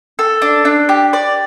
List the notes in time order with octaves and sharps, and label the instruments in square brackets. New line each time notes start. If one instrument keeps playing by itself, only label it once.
[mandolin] A4
D4
D4
G4
D5